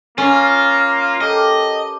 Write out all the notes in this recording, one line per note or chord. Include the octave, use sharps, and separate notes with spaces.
A#3 C#4 F4
G4 A4 A#4 D#5